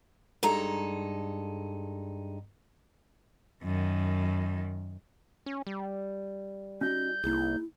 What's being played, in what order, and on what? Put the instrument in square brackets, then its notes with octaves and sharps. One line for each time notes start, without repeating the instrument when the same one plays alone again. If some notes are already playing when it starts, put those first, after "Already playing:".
[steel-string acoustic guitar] G2 G#3 D#4 A4 A#5
[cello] F#2 D#3
[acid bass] C#4
G3
[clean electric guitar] C#4 D#4 D#5 [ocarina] F#4 [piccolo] G6
[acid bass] C2 [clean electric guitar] A#3 D#4 G#4 [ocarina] E4